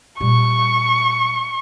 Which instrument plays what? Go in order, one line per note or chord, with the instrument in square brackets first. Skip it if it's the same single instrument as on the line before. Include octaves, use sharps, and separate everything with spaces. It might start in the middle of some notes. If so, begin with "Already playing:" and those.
[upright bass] A#2 G3 [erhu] C#6